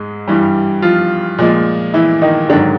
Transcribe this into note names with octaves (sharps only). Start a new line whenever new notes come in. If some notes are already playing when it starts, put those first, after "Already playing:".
Already playing: G#2 G#3
G2 E3 G3
F3 F4
A#2 F3 G#3
E3 E4
D#3 D#4
G#2 D3 D#3 F#3 D4